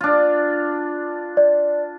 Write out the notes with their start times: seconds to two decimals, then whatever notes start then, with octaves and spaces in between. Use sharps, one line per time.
0.01 D4 F4
1.37 D5